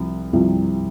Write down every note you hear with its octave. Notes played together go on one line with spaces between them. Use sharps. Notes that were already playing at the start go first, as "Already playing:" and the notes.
Already playing: C2 C3 F3
C2 C3 F3